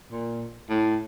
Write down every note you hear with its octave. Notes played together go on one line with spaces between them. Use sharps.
A#2
A2